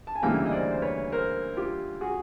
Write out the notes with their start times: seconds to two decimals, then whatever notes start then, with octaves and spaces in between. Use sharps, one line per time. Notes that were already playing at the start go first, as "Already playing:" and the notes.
0.07 A5
0.16 G#5
0.22 D2 C#3 E3 G3 A#3 F5 G5
0.46 D#5
0.52 C5 D5
0.71 C5
0.82 B4 C#5
1.12 A#4 C5
1.57 F4 G4
2.01 F#4 G#4